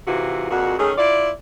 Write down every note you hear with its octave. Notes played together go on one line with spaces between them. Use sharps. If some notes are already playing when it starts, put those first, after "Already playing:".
G#2 C3 E3 F4 F#4
F2 A#2 G#3 F#4
D#3 A3 C#4 G#4
E4 F4 D5